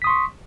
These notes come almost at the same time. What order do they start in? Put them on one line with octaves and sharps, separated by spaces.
B6 D#6 C6 C#6